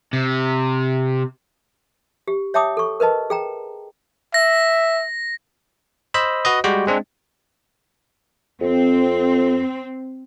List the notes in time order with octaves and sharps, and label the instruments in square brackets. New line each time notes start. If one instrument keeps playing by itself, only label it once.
[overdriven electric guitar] C3
[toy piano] G4
C#5 E5 G5 A5 D6 D#6
A4 C#6
A#4 B4 D#5 A5
G#4 G5 A#5
[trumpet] E5 [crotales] A#6
[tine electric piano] C5 D#5 B5 E6
F#4 B4 D#5
G3 G#3 F#4 G4 G5
G#3 C4 D4
[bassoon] F2 [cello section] C4